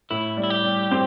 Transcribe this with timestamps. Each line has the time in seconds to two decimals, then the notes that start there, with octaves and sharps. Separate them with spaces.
0.10 A2 E4
0.37 G3
0.44 E4
0.50 G4
0.64 G3
0.91 C4